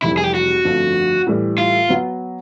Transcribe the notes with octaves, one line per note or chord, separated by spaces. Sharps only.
F1 F2 C3 E3 G3 E4
G#4
G4
F#4
G1 F2 D3 F3 A3
A2 E3 G3
F4
F#3 B3